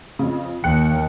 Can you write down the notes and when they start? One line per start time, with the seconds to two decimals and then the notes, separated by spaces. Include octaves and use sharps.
0.19 F2 C#3
0.64 D#2 G5 F#6 C#7